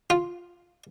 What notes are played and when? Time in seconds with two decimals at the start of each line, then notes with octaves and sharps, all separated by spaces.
0.10 F4